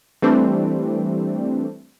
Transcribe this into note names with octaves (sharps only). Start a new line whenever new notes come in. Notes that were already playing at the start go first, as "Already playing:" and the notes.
E3 G3 A3 C4 D4